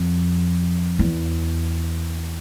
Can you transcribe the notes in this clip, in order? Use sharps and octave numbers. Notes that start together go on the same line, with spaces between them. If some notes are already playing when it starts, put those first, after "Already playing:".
Already playing: F2
E2